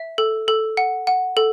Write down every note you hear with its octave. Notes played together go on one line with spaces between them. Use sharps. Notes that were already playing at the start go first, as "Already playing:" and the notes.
Already playing: E5
A4
A4
F#5
F#5
A4